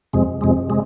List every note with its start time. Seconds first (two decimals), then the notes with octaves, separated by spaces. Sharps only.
0.13 F2 C3 G#3
0.41 F2 C3 G#3
0.70 C3 G#3